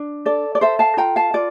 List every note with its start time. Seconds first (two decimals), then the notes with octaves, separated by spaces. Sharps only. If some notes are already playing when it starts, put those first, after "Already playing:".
Already playing: D4
0.26 A4 D5
0.55 D5
0.61 A4 C5 E5
0.79 F5 A5
0.97 F4 G5 A#5
1.16 F5 A5
1.34 F4 D5